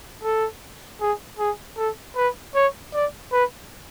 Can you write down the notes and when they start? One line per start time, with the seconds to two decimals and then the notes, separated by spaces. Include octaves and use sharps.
0.23 A4
1.01 G#4
1.39 G#4
1.77 A4
2.16 B4
2.55 C#5
2.94 D5
3.33 B4